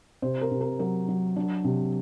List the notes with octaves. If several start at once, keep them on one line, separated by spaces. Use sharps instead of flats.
C3 C5
A#4
C3
A#4
F#3 A#4
F#3
F#3 D4
C3